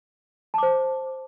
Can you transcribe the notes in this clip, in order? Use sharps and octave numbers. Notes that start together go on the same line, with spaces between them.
C5 A5 D6